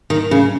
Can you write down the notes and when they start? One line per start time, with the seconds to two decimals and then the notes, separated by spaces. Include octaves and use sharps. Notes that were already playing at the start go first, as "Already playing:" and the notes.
0.10 D#3
0.31 C#3